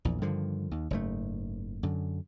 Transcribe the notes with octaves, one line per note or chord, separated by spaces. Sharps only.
A#1 E2
G2 D3 D#3 F3
D#2
F#1 G#2 A3
F#2 D3